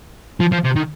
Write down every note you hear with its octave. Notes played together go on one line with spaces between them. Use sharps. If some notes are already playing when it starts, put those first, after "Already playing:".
F3
F3
C3
D#3